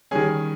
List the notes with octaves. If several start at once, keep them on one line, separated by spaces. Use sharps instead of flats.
D#3 G3 C#4 G#4 G#5